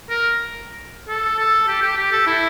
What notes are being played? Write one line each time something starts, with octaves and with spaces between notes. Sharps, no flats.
A#4
A4
A4
G4
G4
G4
A4
E4